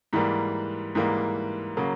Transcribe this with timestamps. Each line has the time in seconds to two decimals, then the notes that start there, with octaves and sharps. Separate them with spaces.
0.13 G#2 E3 G3 A#3
0.95 G#2 E3 G3 A#3
1.77 C#3 F#3 A#3